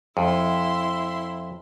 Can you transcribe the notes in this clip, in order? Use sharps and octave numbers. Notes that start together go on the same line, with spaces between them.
F2 E4 E5 C6